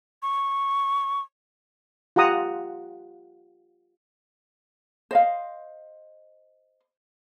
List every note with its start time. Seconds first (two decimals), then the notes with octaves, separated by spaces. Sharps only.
0.22 C#6
2.16 F4 G4 F#5 A#5 D#6
5.11 C5 D#5 F5